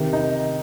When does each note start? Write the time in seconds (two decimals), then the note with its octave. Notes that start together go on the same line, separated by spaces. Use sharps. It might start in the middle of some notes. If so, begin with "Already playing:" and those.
Already playing: C3 D#3
0.13 D#4